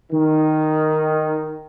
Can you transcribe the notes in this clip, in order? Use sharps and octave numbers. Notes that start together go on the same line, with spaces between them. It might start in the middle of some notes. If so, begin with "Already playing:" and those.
D#3